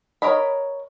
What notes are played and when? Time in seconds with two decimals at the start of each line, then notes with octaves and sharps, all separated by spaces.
0.22 A#4 C#5 D#5 B5